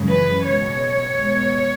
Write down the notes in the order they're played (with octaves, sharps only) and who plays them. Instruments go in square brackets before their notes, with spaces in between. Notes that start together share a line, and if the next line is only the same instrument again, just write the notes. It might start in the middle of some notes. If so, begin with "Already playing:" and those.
Already playing: [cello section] F#2 C#3 E3 G#3
B4
B2 G#3 C#5
B2 G#3